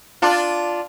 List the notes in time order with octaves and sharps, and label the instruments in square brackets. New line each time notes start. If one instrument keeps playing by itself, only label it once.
[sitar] D4 F4